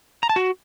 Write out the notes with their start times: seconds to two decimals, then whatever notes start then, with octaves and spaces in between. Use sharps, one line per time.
0.23 A#5
0.29 A5
0.36 F#4